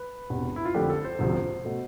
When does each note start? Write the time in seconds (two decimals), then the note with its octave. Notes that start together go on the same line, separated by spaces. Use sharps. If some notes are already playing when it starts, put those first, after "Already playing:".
Already playing: B4
0.30 E1 E2 C3
0.56 E4
0.65 F4
0.74 F2 D3 A3 G4
0.90 A4
1.05 C5
1.19 E1 D2 C3 F3
1.65 B2 A3